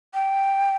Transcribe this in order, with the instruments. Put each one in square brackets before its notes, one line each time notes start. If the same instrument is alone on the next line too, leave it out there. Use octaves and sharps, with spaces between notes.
[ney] G5